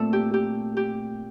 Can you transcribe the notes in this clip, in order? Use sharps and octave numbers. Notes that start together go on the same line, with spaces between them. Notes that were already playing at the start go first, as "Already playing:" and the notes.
Already playing: A#2 A3 C4 A4
G4
G4
G4